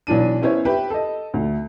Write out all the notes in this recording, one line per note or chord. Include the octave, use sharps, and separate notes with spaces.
B1 E3 D4 D#7
B3 C#4 E4 C5 C#5
G4 B4 E5 G5 B5
A4 D#5
D2